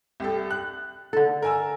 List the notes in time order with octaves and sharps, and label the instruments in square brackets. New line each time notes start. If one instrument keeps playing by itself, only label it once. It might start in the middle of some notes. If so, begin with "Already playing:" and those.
[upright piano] C2 G4 A4
F#6
[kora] D3 A4
[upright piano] A#4 G#5 E6